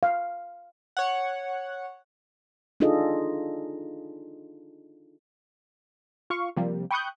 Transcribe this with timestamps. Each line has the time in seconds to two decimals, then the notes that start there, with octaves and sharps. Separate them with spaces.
0.03 F5
0.97 C#5 F#5
2.80 D4 D#4 F4 G#4 A4 D#5
6.30 F4 F5 C#6
6.56 C3 F3 G3 A#3
6.91 G5 B5 C#6 D#6 F#6 G6